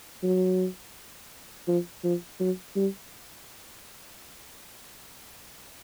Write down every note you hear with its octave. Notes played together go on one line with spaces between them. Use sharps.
F#3
F3
F3
F#3
G3